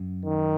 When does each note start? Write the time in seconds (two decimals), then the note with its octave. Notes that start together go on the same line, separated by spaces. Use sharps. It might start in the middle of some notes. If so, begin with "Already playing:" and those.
Already playing: F#2
0.25 D#3